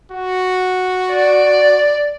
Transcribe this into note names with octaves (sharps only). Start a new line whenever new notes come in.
F#4
D5